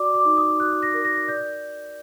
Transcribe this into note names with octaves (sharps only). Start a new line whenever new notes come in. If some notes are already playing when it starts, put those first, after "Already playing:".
Already playing: F#4 D5 D6
D6
D#4
D#6
F#4 F#6
A#6
A#4
A#6
D5 G6